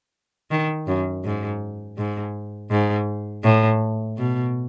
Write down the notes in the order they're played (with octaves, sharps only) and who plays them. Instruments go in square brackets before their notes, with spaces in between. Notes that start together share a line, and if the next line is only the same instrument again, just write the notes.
[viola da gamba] D#3
F#2
G#2
G#2
G#2
A2
B2